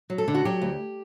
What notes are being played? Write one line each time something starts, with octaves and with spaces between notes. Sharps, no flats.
F#3
A4
D3
F#4
F#3 G4
D2